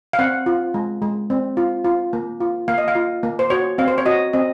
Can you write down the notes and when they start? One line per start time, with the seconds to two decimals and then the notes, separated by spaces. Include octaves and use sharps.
0.13 F5
0.19 C4 F#5
0.46 F4
0.74 G#3
1.02 G#3
1.30 C4
1.57 F4
1.84 F4
2.13 A#3
2.40 F4
2.68 A#3 F5
2.78 D#5
2.88 F5
2.95 F4
3.23 A#3
3.39 C5
3.50 F#4 C#5
3.78 C4 F5
3.88 C5
3.98 C#5
4.06 F#4 D#5
4.33 C4 D#5